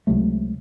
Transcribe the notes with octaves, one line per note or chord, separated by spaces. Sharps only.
C#2 C3 F#3 A3